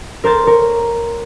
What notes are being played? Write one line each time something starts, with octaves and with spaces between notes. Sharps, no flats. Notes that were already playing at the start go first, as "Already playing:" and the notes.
A#4 C5 G6 A6
A#4 C#5